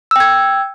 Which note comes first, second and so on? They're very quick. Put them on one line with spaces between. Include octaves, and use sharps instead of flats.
E6 G5 G#6